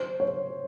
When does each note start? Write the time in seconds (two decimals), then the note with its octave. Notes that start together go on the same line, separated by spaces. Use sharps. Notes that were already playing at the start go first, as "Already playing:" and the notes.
Already playing: C5
0.20 C#5